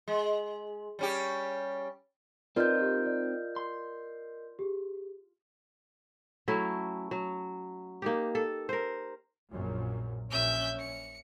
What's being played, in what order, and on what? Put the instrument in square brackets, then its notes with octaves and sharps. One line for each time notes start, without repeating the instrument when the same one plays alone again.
[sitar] G#3
G3 C#4 G4
[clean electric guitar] C4 D#4 [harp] F4 [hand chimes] A#4 D#5 G6 [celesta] B4 D5
[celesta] G4
D5
[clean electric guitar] C6
[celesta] G4 G#4
[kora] F#3 A3 C#4 E4
F#3
A#3 D#4 G4
A4
A#4 C5
[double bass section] A#1 F#2 A#2
[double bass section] A#1 C#4 [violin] E5 G6
[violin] C#7